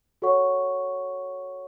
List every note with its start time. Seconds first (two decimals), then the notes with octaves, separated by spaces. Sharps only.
0.22 F#4 A4 C#5 F#5 C#6